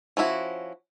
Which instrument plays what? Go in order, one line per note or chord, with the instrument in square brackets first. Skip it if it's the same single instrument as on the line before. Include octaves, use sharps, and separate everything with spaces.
[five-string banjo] F3 C#4 E4 F#4